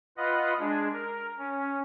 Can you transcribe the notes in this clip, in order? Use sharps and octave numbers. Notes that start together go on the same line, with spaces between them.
F4 B4 D#5 F#5
G#3 D4 G#4
A#4
C#4